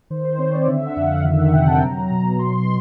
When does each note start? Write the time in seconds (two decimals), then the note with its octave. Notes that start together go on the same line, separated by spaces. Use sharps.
0.10 D#3 C5
0.25 C5
0.38 C4 C#5
0.53 D5
0.68 D3 E5
0.87 F#5
0.96 F2
1.06 F5
1.25 D#3 E5
1.39 F#5
1.53 C3 G5
1.68 A5
1.81 F#3 A#5
2.11 B2
2.39 B2 C6